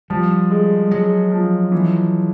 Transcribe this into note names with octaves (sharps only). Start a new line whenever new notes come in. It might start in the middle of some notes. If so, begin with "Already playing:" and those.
F3 G3
G#3
F#3 G#3
F3
E3